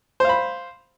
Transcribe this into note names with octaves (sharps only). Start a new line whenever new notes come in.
C5 F5 B5